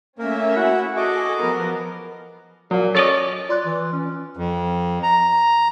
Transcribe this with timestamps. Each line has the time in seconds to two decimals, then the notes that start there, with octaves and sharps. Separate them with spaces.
0.19 A3 A#3 C#4 A#4 E5
0.56 E4 F#4 F#5
0.97 F#4 G#4 A4 D#5 D6
1.40 F3 B3 A#4
2.71 A#2 F#3
2.95 C#4 A4 D5 D#5
3.49 F4 D5 C6 F#6
3.65 E3
3.93 C#4
4.37 F2
5.03 A#5